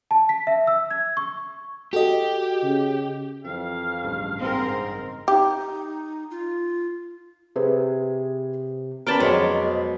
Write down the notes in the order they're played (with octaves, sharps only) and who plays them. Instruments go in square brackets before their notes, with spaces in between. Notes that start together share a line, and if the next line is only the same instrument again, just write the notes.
[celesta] A5
B6
E5
E6
G#6
C#6
[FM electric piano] F#4 D#5 [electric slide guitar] G4 [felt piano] A4
[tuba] C#3
[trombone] F2 [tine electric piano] E3 C4 [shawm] F5
[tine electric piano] A1 G2 C#3
[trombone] G#2 [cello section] C4 A#4
[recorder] D#4 [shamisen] G4
[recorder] F4
[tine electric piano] C3 [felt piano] G#4 B4 C5
[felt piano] B3 C#4 [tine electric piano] A#4 A5 B5 [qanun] D5 G5 D6
[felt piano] F2 [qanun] B2 F#3 [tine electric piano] G#3